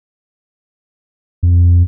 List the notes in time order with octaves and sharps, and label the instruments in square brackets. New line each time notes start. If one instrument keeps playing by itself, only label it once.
[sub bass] F2